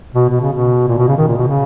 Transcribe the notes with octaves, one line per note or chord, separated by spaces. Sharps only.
B2
B2
C#3
B2
A#2
B2
C#3
D#3
A#2
B2
C#3